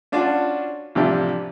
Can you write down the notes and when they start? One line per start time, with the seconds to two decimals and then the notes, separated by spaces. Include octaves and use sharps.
0.12 C#4 D4 F4 F#4 A5
0.95 A1 C3 F3 D4 G4